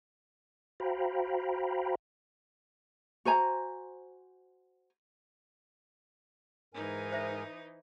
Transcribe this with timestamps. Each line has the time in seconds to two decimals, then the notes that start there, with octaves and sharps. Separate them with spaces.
0.80 F#4 C5 F5 G5 A#5 B5
3.25 F#4 C5 G#5 A#5
6.74 G#2 E3 D#4 A#4 G#5
7.12 C5 E5